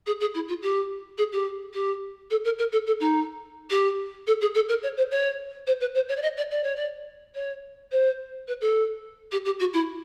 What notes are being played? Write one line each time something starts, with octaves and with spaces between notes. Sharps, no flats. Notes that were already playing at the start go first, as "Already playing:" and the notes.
G#4
G#4
E4
F4
G4
G#4
G4
G4
A4
A#4
A#4
A4
A4
D#4
G4
A4
G#4
A4
A#4
C#5
C5
C#5
C5
B4
C5
C#5
D5
D#5
D5
D5
C#5
D5
C#5
C5
B4
A4
G4
G4
F#4
E4